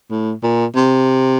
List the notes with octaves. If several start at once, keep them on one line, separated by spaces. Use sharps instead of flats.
A2
A#2
C3